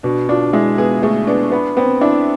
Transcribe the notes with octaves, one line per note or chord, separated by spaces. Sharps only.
B2 D4
D4 F4
G#3 E4
B3 G#4
A3 G#4
B3 D4
B3
B3 C4
D4 E4